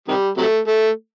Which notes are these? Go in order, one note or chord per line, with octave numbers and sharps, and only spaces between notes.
C3 D#3 G3
C3 F#3 A3
A3